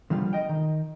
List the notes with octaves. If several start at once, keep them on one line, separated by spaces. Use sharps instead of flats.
D3 F3 G3 F4
D#5 G5
D#3